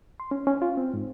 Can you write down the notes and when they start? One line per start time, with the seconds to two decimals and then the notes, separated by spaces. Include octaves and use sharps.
0.20 C6
0.31 C#4
0.47 C#4
0.62 F4
0.77 C4
0.94 G#2